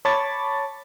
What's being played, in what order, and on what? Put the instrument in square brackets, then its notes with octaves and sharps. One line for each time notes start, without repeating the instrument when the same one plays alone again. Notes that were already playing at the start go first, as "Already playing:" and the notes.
[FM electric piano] C#5 A5 B5 C#6 D6 A6